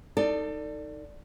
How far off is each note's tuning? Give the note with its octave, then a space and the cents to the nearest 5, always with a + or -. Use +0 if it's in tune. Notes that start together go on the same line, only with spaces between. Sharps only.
D#4 +0 A4 +30 D5 +0